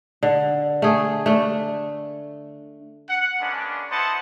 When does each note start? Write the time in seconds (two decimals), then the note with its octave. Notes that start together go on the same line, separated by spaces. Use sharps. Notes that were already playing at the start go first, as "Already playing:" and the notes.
0.23 D3
0.82 A3 G#4
1.26 A3 D4
3.09 F#5
3.41 G#3 A#3 B3 C#4 D4
3.91 B3 E4 C5 D#5 F#5 A5